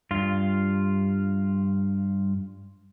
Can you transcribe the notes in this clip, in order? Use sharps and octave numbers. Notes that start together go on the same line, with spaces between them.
G2 F4